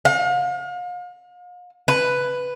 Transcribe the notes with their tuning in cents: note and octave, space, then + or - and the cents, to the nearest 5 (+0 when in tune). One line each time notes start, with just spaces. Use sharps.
F5 +40
B4 +5